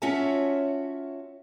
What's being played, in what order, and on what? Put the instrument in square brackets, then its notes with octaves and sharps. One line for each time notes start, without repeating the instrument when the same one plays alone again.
[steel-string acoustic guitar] C#4 F4 F#4 C#5 E5 A5